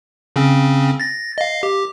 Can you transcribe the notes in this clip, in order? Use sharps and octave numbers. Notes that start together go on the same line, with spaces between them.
C#3 C4 C#4
A6 A#6
D#5 F5
G4